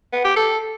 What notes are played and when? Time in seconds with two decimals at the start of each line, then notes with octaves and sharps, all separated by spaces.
0.13 B3
0.25 G4
0.36 A4